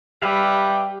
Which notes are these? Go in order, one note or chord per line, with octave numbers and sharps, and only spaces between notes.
G3 G4 B4 E5 F5